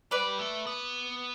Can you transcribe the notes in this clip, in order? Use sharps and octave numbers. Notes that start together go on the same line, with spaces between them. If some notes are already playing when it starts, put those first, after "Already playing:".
G3 B4 D5
A3
B3